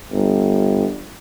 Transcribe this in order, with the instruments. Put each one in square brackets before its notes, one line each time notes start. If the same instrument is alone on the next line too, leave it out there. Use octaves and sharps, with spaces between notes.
[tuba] G1